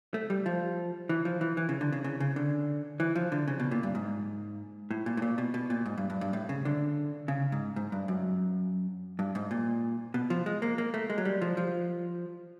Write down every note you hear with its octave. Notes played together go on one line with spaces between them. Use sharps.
A3
G3
F3
E3
F3
E3
E3
C#3
D3
C#3
C#3
C#3
D3
E3
F3
D3
C#3
B2
A#2
G2
G#2
A2
A#2
A2
A#2
B2
B2
A#2
G#2
G2
G2
G2
A2
C#3
D3
C#3
G#2
G#2
G2
F#2
G2
G#2
A#2
B2
F3
G#3
A#3
A#3
A3
G#3
F#3
G3
F3
F3